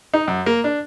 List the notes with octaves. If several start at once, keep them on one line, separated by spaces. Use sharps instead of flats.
D#4
F#2
A#3
D4